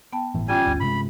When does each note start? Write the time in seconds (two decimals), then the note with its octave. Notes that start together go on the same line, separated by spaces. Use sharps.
0.13 B3 G5 A5
0.35 G1 A2 E3
0.48 G3 C#4 F4 G5 G#5
0.66 G1 D2
0.80 G2 C3 G#3 B5